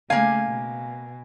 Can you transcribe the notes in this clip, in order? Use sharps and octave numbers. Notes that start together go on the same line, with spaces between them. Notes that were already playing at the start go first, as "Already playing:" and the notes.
C#3 A3 A#3 F5 G#5
B2